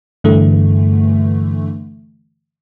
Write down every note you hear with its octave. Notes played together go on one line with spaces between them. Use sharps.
G2 D3 E3 A3